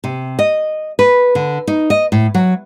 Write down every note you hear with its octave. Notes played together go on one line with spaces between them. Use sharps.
C3
D#5
B4
D3
D#4
D#5
A2
F#3